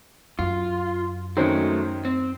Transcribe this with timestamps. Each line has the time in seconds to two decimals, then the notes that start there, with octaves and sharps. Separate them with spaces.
0.39 F#2 F4
1.37 D#3 F#3 G#3 A3 C#4 C5
2.05 C4